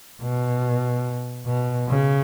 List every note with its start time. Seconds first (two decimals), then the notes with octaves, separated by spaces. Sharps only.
0.23 B2
1.47 B2
1.89 C#3